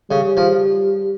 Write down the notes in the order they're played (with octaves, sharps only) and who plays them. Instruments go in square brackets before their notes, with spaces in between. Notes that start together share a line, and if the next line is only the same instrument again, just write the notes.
[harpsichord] C#3 [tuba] G3
[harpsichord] F3